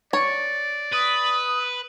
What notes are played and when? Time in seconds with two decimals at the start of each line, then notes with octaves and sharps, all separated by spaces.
0.13 C#5 D5
0.93 B4 D#6